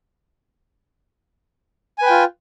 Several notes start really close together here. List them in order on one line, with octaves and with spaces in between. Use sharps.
G#5 B4 G5 F4